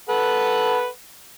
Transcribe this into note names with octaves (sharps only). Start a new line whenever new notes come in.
A4 B4 F#5